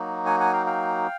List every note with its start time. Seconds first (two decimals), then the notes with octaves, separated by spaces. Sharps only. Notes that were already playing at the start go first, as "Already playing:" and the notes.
Already playing: F#3 A#3 D#4 F#4
0.26 F#5 G#5
0.40 F#5 G#5
0.53 F5 G5
0.66 F5 G5